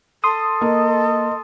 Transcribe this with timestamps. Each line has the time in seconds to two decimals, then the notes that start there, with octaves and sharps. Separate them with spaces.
0.24 A4 C6 D#6
0.61 A#3 D#5